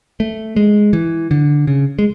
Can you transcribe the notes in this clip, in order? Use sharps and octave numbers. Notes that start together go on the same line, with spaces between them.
A3
G#3
E3
D3
C#3
G#3